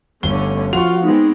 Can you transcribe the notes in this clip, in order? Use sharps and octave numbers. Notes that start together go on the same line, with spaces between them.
G1 D3 A3 C#4 G7
F3 F4 F#4 C#6 F7
G#3 B3 C4 D#4